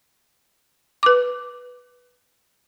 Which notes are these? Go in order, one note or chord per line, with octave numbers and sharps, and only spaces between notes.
B4 D6